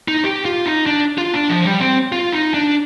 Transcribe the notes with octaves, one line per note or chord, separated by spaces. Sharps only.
D#4
G4
F4
D#4
D4
F4
D4
F3
G3
C4
F4
D#4
D4